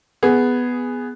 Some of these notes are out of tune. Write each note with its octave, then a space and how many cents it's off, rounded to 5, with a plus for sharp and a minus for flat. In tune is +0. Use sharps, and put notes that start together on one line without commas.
B3 +0 G#4 +0